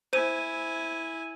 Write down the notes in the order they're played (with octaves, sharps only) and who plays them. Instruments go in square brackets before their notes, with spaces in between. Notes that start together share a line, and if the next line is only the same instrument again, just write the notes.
[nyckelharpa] E4 G#5 [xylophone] C5 D#7